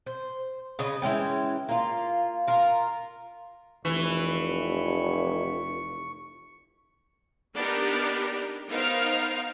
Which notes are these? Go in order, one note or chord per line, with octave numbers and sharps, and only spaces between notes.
C5
C#3 B4 D#5
E3 G#3 C#4 G5
A#3 F4
F4 A#4
F1 E3 C#6
B3 D4 D#4 G4 A#4
B3 D#4 A#4 C5 F5